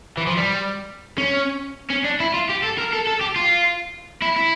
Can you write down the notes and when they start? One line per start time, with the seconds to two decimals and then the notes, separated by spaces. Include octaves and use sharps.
0.17 E3
0.27 F3
0.37 G3
1.18 C#4
1.90 C#4
2.05 D4
2.20 E4
2.34 F4
2.49 G4
2.62 A4
2.78 A#4
2.93 A4
3.07 A4
3.21 G4
3.36 F4
4.22 E4
4.36 E4